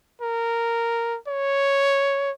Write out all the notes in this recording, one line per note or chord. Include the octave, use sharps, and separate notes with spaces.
A#4
C#5